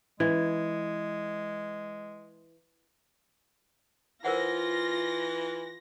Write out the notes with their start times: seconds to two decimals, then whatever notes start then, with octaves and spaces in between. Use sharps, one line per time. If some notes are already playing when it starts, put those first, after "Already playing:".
0.20 E3 G#3
4.25 E3 F4 A#4 C5 F#5 A#6